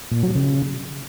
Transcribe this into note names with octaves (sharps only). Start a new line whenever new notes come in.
A#2
F#3
C#3